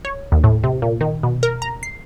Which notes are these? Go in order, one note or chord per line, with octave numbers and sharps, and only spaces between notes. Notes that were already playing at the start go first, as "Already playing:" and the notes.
C#5
D#2
A2
C3
A#2
D#3
B2
A#4
A#5
C7